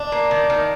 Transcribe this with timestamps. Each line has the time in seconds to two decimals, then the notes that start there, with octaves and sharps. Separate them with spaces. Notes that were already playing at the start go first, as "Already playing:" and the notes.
Already playing: D4
0.12 A#3
0.31 D#3
0.50 D#3